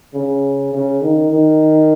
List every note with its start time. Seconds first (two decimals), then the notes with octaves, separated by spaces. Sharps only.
0.14 C#3
0.73 C#3
1.02 D#3
1.31 D#3